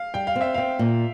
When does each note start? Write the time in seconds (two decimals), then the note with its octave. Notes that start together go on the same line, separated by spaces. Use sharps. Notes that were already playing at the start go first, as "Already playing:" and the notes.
Already playing: F5
0.14 G3 G5
0.27 F5
0.36 C4
0.41 E5
0.54 C4 F5
0.79 A#2